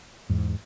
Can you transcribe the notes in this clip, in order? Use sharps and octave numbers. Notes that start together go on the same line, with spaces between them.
E2 G#2